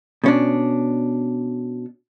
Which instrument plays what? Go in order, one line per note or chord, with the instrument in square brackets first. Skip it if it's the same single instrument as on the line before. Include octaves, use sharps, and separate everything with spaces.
[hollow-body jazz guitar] B2 C#4 D4